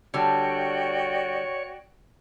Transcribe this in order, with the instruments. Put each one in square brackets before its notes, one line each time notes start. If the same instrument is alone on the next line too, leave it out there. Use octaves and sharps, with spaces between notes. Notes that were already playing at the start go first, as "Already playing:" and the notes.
[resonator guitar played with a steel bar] D3 G3 [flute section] F#4 D5 G5 [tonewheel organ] C#5